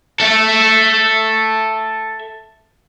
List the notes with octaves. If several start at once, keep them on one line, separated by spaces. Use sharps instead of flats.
A4 E5